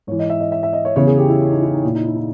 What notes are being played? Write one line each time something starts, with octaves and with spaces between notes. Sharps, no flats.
G#2 E3 C#5
D#5
E5
D#5
E5
E5
D#5
C#5
E2 C#3 E3 C#5
G#4
G4
E4
E4
D#4
E4
D#4
A#2 E4
D#4
E4
D#4